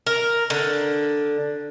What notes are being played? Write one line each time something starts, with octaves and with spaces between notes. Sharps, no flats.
A#4
D3